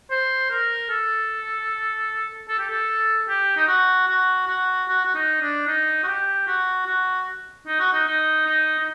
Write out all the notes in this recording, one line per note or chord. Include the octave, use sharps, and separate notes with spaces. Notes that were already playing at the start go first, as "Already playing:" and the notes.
C5
A#4
A4
A4
G4
A4
G4
D#4
F#4
F#4
F#4
F#4
F#4
D#4
D4
D#4
F#4
G4
F#4
F#4
D#4
F#4
D#4
D#4
D#4
D#4